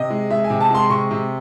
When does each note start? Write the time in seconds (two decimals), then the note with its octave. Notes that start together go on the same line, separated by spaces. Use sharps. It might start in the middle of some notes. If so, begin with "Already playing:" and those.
Already playing: C3 D#5
0.10 G#3
0.30 G#3 E5
0.44 G#5
0.50 C3
0.61 A5
0.71 G#3 C6
0.90 C3 C#6
1.11 C3